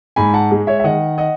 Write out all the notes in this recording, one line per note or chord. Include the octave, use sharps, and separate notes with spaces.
G#2 G#5 B5
F#5 A5
G#3
C#5 E5
E5
D#3 D#5 F#5
D#5 F#5